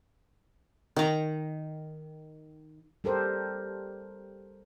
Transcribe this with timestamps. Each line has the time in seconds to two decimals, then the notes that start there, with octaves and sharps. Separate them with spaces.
0.96 D#3 A#5
3.04 G3 G4 A4 A#4 C5